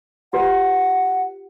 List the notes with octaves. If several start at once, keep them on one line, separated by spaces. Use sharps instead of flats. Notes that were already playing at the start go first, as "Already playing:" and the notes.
F4 G4 B4 F#5